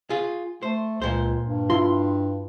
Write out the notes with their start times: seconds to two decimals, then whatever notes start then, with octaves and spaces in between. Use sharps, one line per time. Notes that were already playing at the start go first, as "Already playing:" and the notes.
0.10 F4 G#4
0.63 A3 C5
1.02 C#2 A#2 C5
1.44 G2
1.70 E4 F4 C6